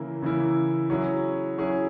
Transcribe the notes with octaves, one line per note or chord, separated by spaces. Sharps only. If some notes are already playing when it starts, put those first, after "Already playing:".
Already playing: C#3 E3 A#3 E4
C#3 E3 A#3 E4
F#3 C#4 E4 G#4
F#3 C#4 E4 G#4